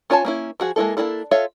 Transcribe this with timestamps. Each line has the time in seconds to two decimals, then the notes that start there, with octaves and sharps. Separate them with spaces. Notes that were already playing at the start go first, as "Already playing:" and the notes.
0.10 C#4 F4 C#5 G#5 A5
0.25 A#3 C#4 E4
0.60 F3 F#4 G#4
0.76 G#3 A#3 E4 A4
0.97 A#3 C#4 D4 E4 A4
1.31 F4 A4 C#5 E5 F5